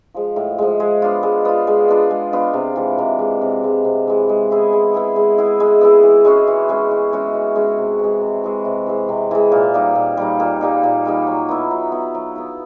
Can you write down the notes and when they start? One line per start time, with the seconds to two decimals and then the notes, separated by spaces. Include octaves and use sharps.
0.14 F3 G#3
0.36 A2
0.58 F3 G#3
0.80 G#3
1.02 B3 D4 F4
1.23 G#3
1.45 B3 D4 F4
1.67 G#3
1.88 B3 D4 F4
2.11 G#3
2.33 B3 D4 F4
2.54 C3
2.76 E3 G#3
2.98 C3
3.19 E3 G#3
3.41 C3
3.64 E3 G#3
3.84 C3
4.07 E3 G#3
4.29 G#3
4.51 B3 E4 G#4
4.73 G#3
4.94 B3 E4 G#4
5.16 G#3
5.38 B3 E4 G#4
5.60 G#3
5.81 B3 E4 G#4
6.03 E3
6.25 G#3 C#4 F#4
6.47 E3
6.69 G#3 C#4 F#4
6.91 E3
7.13 G#3 C#4 F#4
7.34 E3
7.55 G#3 C#4 F#4
7.78 C3
7.99 E3 G#3
8.21 C3
8.44 E3 G#3
8.65 C3
8.86 E3 G#3
9.09 C3
9.31 E3 G#3
9.52 A#2
9.74 G3 A#3 D#4
9.95 A#2
10.17 G3 A#3 D#4
10.40 A#2
10.61 G3 A#3 D#4
10.83 A#2
11.05 G3 A#3 D#4
11.27 F#3
11.49 B3 E4
11.71 F#3
11.92 B3 E4
12.15 F#3
12.36 B3 E4